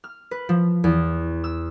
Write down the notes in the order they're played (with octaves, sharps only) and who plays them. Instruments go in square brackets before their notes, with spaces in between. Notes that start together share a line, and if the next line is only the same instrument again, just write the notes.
[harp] F6
B4
F3
E2
E6